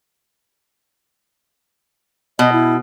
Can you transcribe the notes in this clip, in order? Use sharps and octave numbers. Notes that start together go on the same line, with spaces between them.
B2 D#5
E4